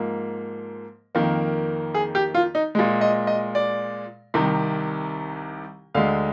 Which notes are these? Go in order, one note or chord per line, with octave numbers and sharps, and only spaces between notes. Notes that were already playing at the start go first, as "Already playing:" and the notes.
Already playing: G#2 F3 A#3
F2 D#3 A#3
G#4
G4
F4
D#4
A#2 G#3
D#5
D#5
D5
C2 C3 D#3
D2 D3 G#3 F5